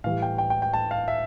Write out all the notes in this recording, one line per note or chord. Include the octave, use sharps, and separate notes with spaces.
A2 E3 G3 F5
G5
G5
G5
G5
A5
F5
E5